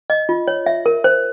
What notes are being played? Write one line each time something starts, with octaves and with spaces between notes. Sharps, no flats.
D#5
F4
C#5
E5
A#4
C5